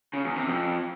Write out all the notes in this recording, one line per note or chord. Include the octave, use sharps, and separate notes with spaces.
C#3
E2
C3
F2